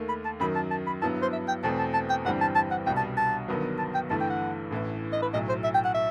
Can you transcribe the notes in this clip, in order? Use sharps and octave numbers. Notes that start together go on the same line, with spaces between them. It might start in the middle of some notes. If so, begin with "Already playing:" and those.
Already playing: D#2 D#3 A3
B5
A5
F#2 D#3 F#3 B5
A5
A5
B5
G2 F#3 B3 E4 A5
C5
E5
G5
E2 B2 A3 C4 A5
A5
A5
G5
G1 G2 E3 G3 C4 F#5
A5
A5
F#5
C2 B2 G3 G5
A5
A5
G1 G2 D#3 F#3 B3
A5
G5
G1 G2 E3 A3 A5
G5
F#5
A1 A2 E3
D#5
B4
B1 A2 F#3 D#5
C5
E5
G5
F#5
E5